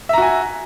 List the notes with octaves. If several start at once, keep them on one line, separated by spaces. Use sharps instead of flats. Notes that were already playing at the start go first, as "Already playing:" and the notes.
F#4 E5 G#5 A#5